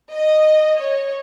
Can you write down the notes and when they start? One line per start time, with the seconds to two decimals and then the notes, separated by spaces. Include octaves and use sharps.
0.14 D#5
0.79 C#5